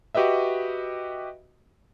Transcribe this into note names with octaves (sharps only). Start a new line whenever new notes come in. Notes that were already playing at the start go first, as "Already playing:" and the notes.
F#4 G4 B4 D#5 E5